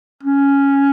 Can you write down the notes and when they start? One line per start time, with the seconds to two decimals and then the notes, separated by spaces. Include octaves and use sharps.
0.23 C#4